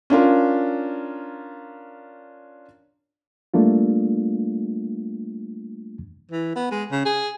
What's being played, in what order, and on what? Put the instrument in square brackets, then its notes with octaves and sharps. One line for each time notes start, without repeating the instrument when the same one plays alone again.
[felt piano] C#4 D4 F4 A#4
[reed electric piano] G3 A3 A#3 D4 F4
[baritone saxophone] E3
B3
G#3
C#3
G#4